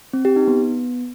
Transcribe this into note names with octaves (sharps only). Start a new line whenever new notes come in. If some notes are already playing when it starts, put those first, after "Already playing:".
C4
G4
D#4
B3